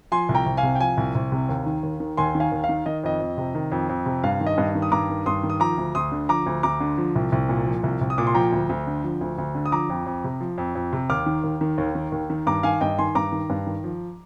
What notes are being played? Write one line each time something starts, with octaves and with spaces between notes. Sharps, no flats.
F3 G#5 C6
C2
G5 A#5
C2
F5 G#5
C3
G5
F3 F5 G#5
C2
C2
C3
D#2
D#3
D#2
D#3
D#2 G#5 C6
D#3
F5 G#5
D#2
F5
D#3
D#3 D#5
F2 D#5
F2
C3
D#3
F2
F2
C3
G2 F5
D#3
D#5
G2
D#3
D#6
G2 A#5 D6
D#3
G2 C6 D#6
D#3
D#6
F3 A#5 D6
D2
D2 C6 D#6
D3
F3 A#5 D6
D2
D2 A#5 D6
D3
F3
C2
C2
A#2
F3
C2
C2
D#6
A#2 D6
C6
F3 G5 A#5
D2
D2
D3
F3
D2
D2
D3
D#6
F3 A#5 D6
F2
F2
C3
F3
F2
F2
C3
D#2 D6 F6
D#3
D#2
D#3
D#2
D#3
D#2
D#3
G2 A#5 D6
D#3 F5 G#5
G2 D#5 G5
D#3 G#5 C6
G2 A#5 D6
D#3
G2
D#3
F3